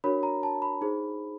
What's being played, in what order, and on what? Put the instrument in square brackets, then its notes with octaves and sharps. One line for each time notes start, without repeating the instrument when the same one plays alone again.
[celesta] D4 F#4 A#4 C#5 B5
A#5
A5
B5
D#4 G#4 C5